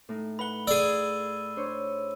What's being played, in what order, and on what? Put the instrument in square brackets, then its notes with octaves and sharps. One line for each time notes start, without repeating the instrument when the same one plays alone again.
[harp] A2 D#4
[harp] B4 F#5 [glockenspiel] B5 G7
[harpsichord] G#4 D5 [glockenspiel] E6 D#7
[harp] D4 C5 C#5